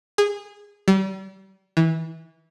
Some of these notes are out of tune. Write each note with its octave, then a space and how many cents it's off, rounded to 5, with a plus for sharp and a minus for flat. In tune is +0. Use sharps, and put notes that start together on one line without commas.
G#4 -20
G3 -35
E3 -20